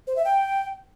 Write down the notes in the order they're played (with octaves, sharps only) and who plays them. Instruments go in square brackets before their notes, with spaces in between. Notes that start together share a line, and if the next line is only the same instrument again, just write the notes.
[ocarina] C5
E5
G5